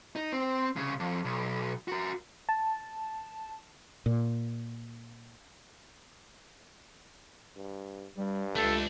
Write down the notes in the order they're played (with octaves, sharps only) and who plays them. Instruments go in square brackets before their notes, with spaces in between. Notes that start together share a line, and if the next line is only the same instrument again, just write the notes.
[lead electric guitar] D#4
C4
C2 C#3
F2
B1
F#4 A#4
[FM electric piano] A5
[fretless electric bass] A#2
[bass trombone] G2
[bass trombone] G2 [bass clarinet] G3
[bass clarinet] C#2 [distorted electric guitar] A3 D4 [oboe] A4